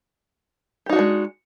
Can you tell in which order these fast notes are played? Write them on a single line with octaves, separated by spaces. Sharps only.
G4 D#4 F#4 D4 G#3